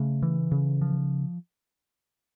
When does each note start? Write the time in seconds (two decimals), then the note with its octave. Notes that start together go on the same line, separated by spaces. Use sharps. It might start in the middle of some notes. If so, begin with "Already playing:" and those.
Already playing: C#3 A3
0.23 E3
0.52 C#3
0.81 F3